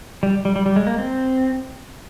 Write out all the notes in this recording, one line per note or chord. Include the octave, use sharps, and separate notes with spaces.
G3
G3
G3
G3
G#3
A#3
C4